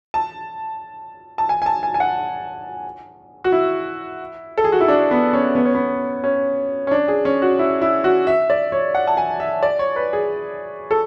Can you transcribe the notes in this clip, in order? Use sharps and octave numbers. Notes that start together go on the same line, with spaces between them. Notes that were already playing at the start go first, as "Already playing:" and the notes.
A5
A5
G#5
G#5
A5
G#5
G#5
F#5
F#4
E4
A4
G#4
F#4
E4
D4
B3
C#4
B3
C#4
B3
C#4
C#4
D4
G#4
C#4
F#4
E4
E4
F#4
E5
D5
C#5
F#5
A5
G#5
E5
D5
C#5
B4
G#4
A4